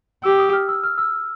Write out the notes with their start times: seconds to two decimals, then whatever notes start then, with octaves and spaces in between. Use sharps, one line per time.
0.24 G4 E6
0.39 D#6
0.53 F6
0.69 E6
0.84 F6
0.98 E6